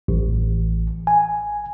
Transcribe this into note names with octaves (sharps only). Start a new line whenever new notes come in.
A1
G#5